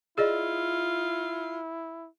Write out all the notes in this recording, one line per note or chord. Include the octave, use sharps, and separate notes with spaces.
E4 F4 G#4 D5 D#5